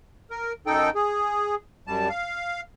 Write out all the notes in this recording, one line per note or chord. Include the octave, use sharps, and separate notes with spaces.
A#4
F#2 D#4 A4 G5
G#4
F#2 G3 A5
F5